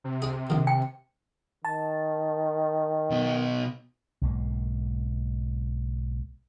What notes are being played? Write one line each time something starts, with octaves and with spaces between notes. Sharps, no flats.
C3
D4 G#4
A#1 D#3
G5
D#3 A5
B2 D#4
B1 G#2 A#3